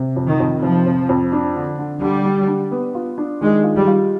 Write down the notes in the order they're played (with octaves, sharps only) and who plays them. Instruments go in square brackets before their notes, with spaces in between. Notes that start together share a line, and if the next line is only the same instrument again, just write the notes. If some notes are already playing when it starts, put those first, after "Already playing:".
Already playing: [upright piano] C3
F2
[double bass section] D#3
[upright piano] F2
[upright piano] C3 [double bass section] F3
[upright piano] F2
F2
D4
D3
D3
[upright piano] D3 [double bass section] G3
[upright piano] D4
D4
B3
F4
D4
[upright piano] D#3 [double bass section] G#3
[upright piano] F4
[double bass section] G3
[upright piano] F4